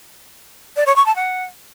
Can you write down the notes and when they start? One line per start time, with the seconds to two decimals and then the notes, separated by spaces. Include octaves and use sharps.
0.76 D5
0.86 C#5
0.96 C#6
1.06 A5
1.16 F#5